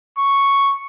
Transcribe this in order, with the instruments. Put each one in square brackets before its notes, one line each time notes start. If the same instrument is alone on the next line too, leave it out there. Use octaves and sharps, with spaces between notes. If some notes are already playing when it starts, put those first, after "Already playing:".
[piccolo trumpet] C#6